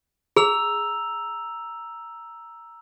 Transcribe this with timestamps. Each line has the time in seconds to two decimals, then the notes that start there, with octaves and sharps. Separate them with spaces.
0.36 G#4 A#5 E6 F7